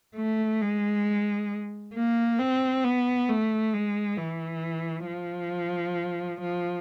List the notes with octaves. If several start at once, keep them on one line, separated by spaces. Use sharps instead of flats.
A3
G#3
A#3
C4
B3
A3
G#3
E3
F3
F3